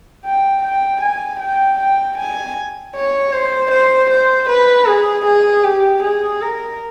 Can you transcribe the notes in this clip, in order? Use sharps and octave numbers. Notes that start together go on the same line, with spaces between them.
G5
G5
G#5
G5
G5
G#5
C#5
C5
C5
C5
B4
G#4
G#4
G4
G#4
A#4